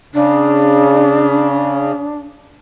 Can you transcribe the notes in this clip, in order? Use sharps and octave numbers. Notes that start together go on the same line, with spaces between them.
C#3 D4